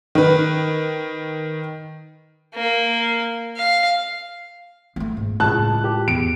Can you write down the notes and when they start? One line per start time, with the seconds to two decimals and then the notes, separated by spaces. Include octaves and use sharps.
0.15 D#3 B4
2.55 A#3
3.57 F5
4.96 A3 B3
5.17 G#2
5.40 C#2 A2 A5 F#6
5.84 G4
6.08 E2 D7